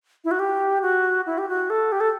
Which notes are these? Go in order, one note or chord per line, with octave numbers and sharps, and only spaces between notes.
E4
F#4
G4
F#4
E4
G4
F#4
A4
G4
A4